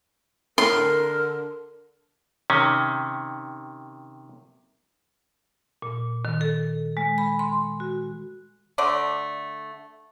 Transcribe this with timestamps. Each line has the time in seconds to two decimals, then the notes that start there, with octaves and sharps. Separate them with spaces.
0.58 A2 A#4 C6
0.71 D3
2.50 C3 D#3 C#4
5.82 A#2
6.25 D#3
6.41 A4
6.97 G#3
7.18 B5
7.39 C6
7.80 F#4
8.78 D3 A3 D5